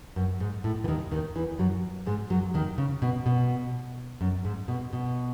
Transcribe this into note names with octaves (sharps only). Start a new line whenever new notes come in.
F#2
G#2
A2
E3
D#2 D#3
D#2 D#3
E2 E3
F#2 F#3
G#2 G#3
F#2 F#3
D#2 D#3
C#3
B2
B2
F#2
G#2
B2
B2